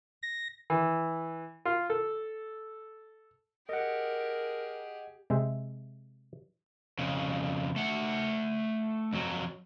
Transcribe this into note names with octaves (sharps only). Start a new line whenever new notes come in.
A#6
E3
F4
A4
G4 G#4 A#4 D#5 F#5
C3 G#3 C5 E5
F2 C#3
A3 F#5
F2 F#3